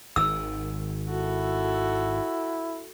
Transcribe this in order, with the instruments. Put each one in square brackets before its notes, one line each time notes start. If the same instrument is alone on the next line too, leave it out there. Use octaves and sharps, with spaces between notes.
[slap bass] G#1 G#2 D#3 [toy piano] E6
[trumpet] E4 [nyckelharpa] F#4 A4